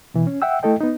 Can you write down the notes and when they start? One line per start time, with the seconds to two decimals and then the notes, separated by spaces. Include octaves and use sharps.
0.14 B2 E3
0.27 C#4
0.42 E5 F#5 G5 E6
0.63 A3 E4 A4 D#5 G5
0.81 B3 D#4